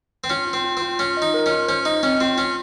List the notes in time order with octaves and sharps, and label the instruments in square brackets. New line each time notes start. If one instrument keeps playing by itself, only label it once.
[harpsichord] C4
[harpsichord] C#4 [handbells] F4
[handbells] F4
[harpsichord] C4
[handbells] F4
[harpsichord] C4
[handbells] F4
[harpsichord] C#4 [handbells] F4
[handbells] D#5
[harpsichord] D#4
[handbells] A#4
[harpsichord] C#4
[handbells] F4
[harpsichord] C#4 [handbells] C5
[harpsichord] D#4 [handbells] D#5
[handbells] C4 [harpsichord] C#4
[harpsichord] C4 [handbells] F4
[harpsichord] C#4 [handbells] F4